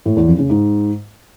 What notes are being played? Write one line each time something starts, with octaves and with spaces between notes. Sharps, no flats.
A2
E2
F2
C#3
G#2